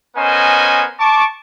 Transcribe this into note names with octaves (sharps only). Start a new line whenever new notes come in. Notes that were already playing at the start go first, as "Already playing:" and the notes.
B3 C#4 A#4 C5 D#5 G#5
A5 C#6 D6